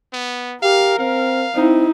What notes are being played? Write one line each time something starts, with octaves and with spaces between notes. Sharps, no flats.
B3
G4 A#4 F5
C4 F5
C4 D#4 E4